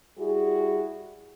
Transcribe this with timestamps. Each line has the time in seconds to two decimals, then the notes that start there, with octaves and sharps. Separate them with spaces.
0.18 G3 E4 F#4 G#4